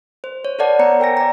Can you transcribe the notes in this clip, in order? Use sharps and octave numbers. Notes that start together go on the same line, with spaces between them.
C5
C#5
A4 B4 C#5 D5 F#5 A5
B3 C5 A#5 C#7
A#4 G5 G#5 A#6
D5 A#5